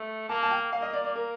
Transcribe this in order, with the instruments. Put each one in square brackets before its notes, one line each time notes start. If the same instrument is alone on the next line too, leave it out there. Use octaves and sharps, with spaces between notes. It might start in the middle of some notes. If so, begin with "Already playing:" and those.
Already playing: [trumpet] A3
[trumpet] A#3 [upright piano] A5
[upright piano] A5
G5
[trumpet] A#3 [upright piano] F5
[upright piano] D#5
D5
D5
A#4